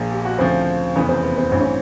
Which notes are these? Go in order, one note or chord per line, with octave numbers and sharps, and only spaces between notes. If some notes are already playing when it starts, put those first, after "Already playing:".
Already playing: A#1 A#2 F3 G#4
G4
F#4
D2 C#3 F3 C4
F1 E2 C#3 E3 B3
C4
B3
C4
A1 G2 E3 C4
C#4